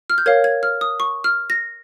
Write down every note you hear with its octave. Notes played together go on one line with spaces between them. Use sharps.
F6
G6
A#4 C#5 F5 G#6
G#6
F6
D#6
C#6
F6
A#6